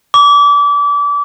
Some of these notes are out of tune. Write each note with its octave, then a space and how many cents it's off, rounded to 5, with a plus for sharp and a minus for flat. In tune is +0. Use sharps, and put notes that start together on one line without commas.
D6 -30